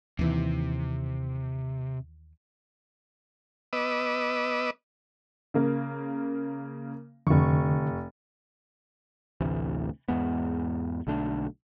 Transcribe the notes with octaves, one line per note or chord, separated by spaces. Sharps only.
D#2 C3 E3
B3 B4 D#5 D6 E6
C#3 A#3
F1 F2 D3 C#6
A1 D2 C3 E3
E2 G#2 G#3 B3
B1 D3 A3 D4